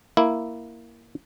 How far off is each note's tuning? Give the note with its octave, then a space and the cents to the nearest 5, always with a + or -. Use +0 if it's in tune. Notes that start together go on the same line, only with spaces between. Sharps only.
A#3 +0 E4 +0